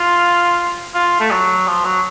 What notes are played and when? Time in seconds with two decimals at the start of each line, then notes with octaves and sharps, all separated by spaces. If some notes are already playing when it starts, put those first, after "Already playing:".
Already playing: F4
0.95 F4
1.20 A3
1.31 F#3
1.67 F3
1.84 F#3